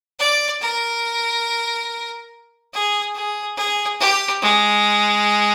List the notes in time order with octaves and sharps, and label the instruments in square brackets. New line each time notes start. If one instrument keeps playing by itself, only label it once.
[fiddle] D5
A#4
G#4
G#4
G#4
G4
G#3